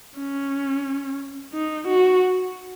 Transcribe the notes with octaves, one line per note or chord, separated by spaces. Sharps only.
C#4
D#4
F#4